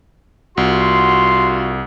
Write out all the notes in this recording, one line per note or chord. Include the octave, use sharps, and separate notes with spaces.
C2 F4 F#4 C6